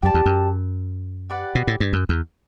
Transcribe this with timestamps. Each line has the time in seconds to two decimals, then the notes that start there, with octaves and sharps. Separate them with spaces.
0.02 F#2 G4 D5 A5
0.14 E2
0.26 F#2
1.30 G4 B4 D5 F#5
1.55 B2
1.67 A2
1.80 G2
1.93 F#2
2.09 E2